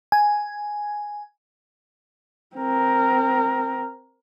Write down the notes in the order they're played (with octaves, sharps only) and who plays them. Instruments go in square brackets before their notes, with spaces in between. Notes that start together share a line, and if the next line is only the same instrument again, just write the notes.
[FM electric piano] G#5
[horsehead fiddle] C4 A#4